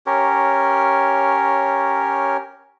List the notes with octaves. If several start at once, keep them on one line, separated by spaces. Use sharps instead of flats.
C#4 G4 A#4 C#5